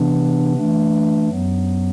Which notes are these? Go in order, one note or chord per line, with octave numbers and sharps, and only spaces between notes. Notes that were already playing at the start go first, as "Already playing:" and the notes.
Already playing: C3 E3 B3 D4
E3 A3 D4
F#2 F#3 B3